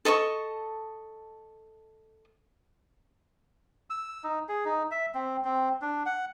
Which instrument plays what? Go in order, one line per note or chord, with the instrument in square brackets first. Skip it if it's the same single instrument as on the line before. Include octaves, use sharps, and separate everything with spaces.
[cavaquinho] A4 D#5 A5 C#6
[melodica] E6
D#4
G#4
D#4
E5
C4
C4
D4
F#5